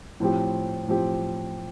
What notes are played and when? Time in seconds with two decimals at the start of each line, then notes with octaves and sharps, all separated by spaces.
0.20 A2 F3 C4 G4
0.87 A2 F3 C4 G4